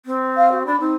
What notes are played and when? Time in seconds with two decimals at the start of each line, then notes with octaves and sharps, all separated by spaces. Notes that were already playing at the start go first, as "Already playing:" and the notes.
0.06 C4
0.37 F5
0.51 F#4
0.66 D4 B5
0.80 C4 D#4